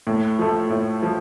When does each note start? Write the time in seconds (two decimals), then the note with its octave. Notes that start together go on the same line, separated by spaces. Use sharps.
0.07 A2
0.39 F3 A3
0.70 A2
1.03 F3